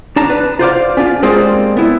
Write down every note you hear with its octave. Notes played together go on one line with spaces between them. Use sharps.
D4 A5 A#5
B4
F4 C5 D5 F5
C#4 D4 F4
G3 G#3 A#3 C4 D#4 F4
B3 E4